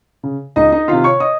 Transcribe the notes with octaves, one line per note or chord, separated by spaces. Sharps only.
C#3
C#2 D#4 D#5
D#4 D#5
C3 D#3 F4 F5
C#5 C#6
D#5 D#6